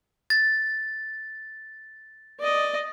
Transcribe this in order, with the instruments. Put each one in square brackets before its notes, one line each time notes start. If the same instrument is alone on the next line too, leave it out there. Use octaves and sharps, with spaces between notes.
[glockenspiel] A6
[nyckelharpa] D5 D#5